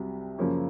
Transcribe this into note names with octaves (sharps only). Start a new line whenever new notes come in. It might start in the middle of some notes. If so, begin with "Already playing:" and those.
Already playing: C2 C3 F#3
F#2 C#3 F3 A#3 C#4